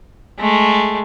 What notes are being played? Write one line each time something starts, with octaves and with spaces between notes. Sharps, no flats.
G#3 A3